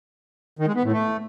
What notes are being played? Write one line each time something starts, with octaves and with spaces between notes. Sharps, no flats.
D#3
G#3
B3
A2
A3